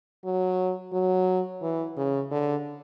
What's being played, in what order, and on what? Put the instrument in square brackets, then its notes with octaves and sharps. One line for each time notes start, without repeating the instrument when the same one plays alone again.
[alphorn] F#3
F#3
E3
C#3
D3